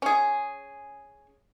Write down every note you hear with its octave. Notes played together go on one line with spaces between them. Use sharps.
C#4 G#4